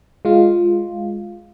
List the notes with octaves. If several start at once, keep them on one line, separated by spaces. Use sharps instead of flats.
G#3 F4